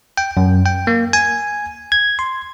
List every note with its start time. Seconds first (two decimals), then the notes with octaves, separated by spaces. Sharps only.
0.17 G5
0.37 F#2
0.66 G5
0.87 A#3
1.13 G#5
1.92 G#6
2.19 C6